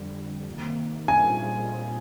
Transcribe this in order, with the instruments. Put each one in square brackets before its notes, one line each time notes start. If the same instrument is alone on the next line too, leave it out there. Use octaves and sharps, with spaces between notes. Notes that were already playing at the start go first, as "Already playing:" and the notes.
Already playing: [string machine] F2 D3 G3
C3 D#3 A#3
[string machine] A#2 G3 C4 F4 G#4 [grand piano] G#5